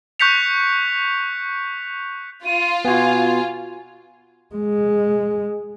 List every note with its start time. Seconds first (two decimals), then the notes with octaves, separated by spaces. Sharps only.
0.20 C#6 F#6 G6 B6 C#7 F7
2.45 F4 D#7
2.85 B3 F#4 G#5
4.55 G#3